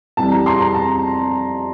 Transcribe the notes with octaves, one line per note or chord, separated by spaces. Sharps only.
F2 E3 G3 A5
A#5
C6
A#5
A5